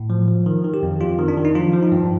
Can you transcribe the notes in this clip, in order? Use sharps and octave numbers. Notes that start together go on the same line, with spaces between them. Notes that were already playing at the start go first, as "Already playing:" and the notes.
Already playing: A2
F3
F3
D#3
D#3
G4
F2
F2 F4
D#3
D4
D#3
D#4
F3 F4
F3
D#4
G2